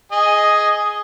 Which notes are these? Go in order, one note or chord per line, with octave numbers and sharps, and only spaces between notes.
G#4 D#5